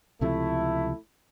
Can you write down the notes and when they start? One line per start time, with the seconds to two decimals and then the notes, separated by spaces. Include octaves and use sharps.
0.21 C#2 C3 F3 A3 E4